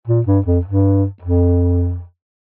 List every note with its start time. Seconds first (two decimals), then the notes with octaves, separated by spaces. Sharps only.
0.08 A#2
0.27 G2
0.46 F2
0.65 G2
1.22 F2